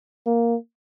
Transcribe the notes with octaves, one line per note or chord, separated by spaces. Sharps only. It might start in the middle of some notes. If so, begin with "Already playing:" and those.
A#3